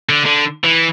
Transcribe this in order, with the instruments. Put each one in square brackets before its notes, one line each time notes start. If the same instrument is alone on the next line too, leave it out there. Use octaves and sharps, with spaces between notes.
[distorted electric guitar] D3
D3
E3